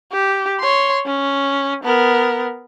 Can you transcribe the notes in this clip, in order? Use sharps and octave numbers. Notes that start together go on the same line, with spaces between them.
G4
C#5 C6
C#4
B3 A#4